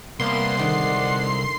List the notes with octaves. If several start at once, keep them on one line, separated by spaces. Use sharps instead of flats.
C2 A#3 B3 C6
D3 D#3 G#3 D5 F#5